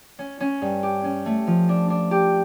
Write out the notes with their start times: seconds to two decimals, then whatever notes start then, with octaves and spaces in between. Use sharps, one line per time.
0.19 C#4
0.40 C#4
0.62 G2
0.83 G4
1.04 C#4
1.26 A3
1.47 F3
1.69 D4
1.90 D4
2.11 G4